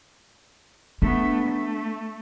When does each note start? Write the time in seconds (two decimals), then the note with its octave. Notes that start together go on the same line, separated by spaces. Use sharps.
1.02 A3 B3 D4
1.47 A3